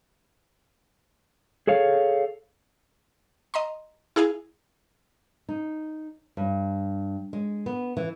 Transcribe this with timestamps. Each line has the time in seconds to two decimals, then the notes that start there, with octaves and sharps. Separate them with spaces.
1.67 G#4 A4 C#5 F5
3.54 D#5 A#5 C6
4.16 E4 G#4 F5 G#5
5.49 D#4
6.37 G2
7.33 G#3
7.66 B3
7.97 E3